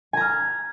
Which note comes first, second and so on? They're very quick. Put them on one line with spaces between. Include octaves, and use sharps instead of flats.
G#5 A#5 F6